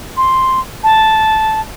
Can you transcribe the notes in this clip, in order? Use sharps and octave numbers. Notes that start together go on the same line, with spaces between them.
C6
A5